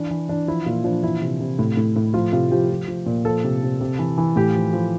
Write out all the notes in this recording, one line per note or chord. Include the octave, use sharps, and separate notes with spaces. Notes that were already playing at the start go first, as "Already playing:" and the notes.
Already playing: E3 D4
E3
E3 D4
F3 E4
A#2 F4
F3 D4
E3 E4
C3
C3
A2
A2
A2
F3 F4
C3 F4
F3 G4
F3
F3
A#2
F3 A4
C3
C3
C3
E3
E3
A2 G4
F3
F3